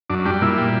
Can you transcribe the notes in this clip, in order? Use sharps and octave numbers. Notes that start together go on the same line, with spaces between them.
F#2 D4
G3 D4
A#2 E4
G3